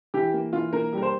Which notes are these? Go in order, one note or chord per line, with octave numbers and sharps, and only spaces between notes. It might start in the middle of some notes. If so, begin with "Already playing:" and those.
E3 G4
A#3
E3 F4
A#3 A#4
G3 A#4
C5